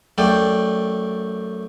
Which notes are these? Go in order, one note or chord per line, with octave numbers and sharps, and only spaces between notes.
F#2 A3 D5 G5